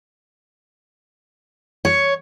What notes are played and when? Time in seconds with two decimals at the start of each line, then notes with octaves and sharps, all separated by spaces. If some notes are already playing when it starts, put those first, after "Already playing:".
1.85 C#5